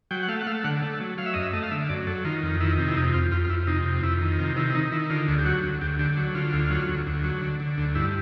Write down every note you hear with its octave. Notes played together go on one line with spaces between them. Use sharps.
F#3 G5
F#5
A3 F5
F#5
A3 F5
D3 F#5
A3
F#3
F#3 F5
E5
F#2 D#5
E5
A3 D#5
F5
D3 E5
F#2 D5
F#3 A4
D#3 F4
F2
D#3 E4
C3
E4
F2 D#4
F2 F4
F2 F4
F4
F2 E4
C3 D#4
F2
F2 E4
D#3
C3 F4
D#3 E4
E4
D#3 D#4
D#3 E4
D3 F4
D2
G4
F#3 F#4
D2
D2 G4
D3 G4
F#3
D3 F4
D2
F#3
D2
D2
F#3
D3
D3
D2
G2 E4